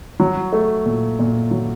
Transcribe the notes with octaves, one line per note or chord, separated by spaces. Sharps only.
F#3
A3
A#2
A#2
F#3